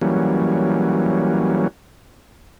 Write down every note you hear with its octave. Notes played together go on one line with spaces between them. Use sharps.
E3 F#3 G3 A#3 C#4